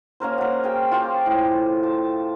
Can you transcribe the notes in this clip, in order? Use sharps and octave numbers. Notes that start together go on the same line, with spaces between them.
A#3 C#4 A#4 C5
A#4 F#5
G#4 G5
F4 G4 C5
A2
A5